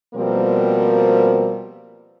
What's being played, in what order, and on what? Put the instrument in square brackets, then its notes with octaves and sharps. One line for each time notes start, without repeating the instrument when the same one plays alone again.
[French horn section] B2 F3 G3 A#3 C4 A#4